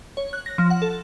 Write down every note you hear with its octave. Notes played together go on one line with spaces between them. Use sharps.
C#5
F#6
A#6
F3
F#5
A4